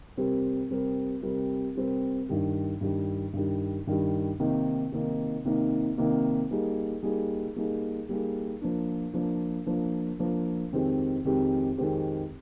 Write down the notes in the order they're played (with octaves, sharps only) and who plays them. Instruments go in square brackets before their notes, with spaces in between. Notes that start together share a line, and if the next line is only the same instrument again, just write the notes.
[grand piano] C3 G3 C4 G4 A#4
C3 G3 C4 G4 A#4
C3 G3 C4 G4 A#4
C3 G3 C4 G4 A#4
G2 D#3 G3
G2 D#3 G3
G2 D#3 G3
G2 D#3 G3
C3 D#3 A#3 D#4
C3 D#3 A#3 D#4
C3 D#3 A#3 D#4
C3 D#3 A#3 D#4
G3 A#3 D#4 G#4
G3 A#3 D#4 G#4
G3 A#3 D#4 G#4
G3 A#3 D#4 G#4
F3 A#3 D4
F3 A#3 D4
F3 A#3 D4
F3 A#3 D4
F2 D#3 G#3 C4 G4
F2 D#3 G#3 C4 G4
F2 D#3 G#3 C4 G4